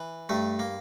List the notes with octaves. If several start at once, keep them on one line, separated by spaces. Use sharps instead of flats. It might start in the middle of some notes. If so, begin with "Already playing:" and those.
Already playing: E3
G2 A3
A#3